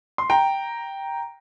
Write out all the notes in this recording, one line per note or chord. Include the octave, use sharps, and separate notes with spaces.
C6
G5 A#5